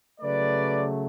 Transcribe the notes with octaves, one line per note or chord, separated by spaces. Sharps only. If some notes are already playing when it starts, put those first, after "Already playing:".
C#3 F#3 A3 B4 D5